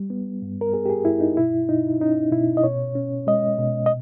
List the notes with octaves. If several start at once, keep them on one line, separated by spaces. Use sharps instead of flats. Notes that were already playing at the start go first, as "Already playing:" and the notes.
Already playing: G3
B3
G2
A#4
B3 G#4
G4
G#4
G2 E4
D#4
B2 E4
B2 D#4
C#4 D#4
B2 E4
D#5
B2 C#5
C#4
G#3 D#5
B2
D#5